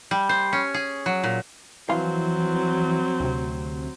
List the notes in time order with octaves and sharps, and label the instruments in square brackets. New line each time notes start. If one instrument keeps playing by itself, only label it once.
[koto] G3
C5
C#4
G#4
F#3
A#2
[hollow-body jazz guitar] F2 F5 C6 [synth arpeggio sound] E3 [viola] F#3 C4
[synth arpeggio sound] D2 C3